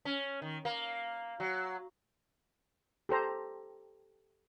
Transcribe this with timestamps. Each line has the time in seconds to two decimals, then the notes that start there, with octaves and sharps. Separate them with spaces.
0.05 C#4
0.42 D#3
0.65 A#3
1.40 F#3
3.09 G4 A4 C5 A#5